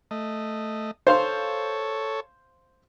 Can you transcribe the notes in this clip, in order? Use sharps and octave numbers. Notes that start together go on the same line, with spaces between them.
A3 D#5
A4 C5 C#5 F5 C6